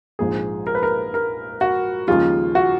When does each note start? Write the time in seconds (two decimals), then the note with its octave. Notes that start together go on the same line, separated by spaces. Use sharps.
0.19 A#1 G#2 F3 G#4
0.67 A#4
0.75 B4
0.83 A#4
1.14 A#4
1.61 F#4
2.08 D#2 C#3 F3 G#3 F4
2.55 F#4